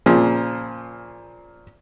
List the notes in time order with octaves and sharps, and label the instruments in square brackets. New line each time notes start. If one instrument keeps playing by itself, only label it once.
[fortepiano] A#2 C#3 F3